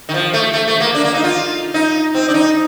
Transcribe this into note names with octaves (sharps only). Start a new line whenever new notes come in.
D#3
F3
A3
A3
A3
A#3
D4
A#3
D#4
F4
D#4
C4
D4
D#4